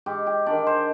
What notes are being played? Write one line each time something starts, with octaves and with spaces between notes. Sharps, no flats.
G#2 G4
G4
D#3 G#3 D4 D5
C5